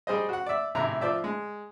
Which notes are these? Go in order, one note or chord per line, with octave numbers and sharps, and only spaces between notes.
G3 G#4 C5 D#5
F#4 F#5
D5 E5
G#1 A2 C3 E4 A#5
F3 C5 D5 E5
G#3